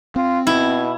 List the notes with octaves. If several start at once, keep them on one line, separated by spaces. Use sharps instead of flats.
C4 F4
B2 E4